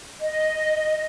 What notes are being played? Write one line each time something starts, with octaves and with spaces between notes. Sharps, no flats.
D#5